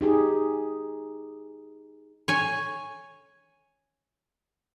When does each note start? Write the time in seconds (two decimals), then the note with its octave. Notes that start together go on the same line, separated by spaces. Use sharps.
0.01 D#4 G4 G#4
2.28 C#5 G#5